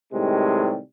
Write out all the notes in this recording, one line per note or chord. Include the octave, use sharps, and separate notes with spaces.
A2 C3 D#3 G3 G#3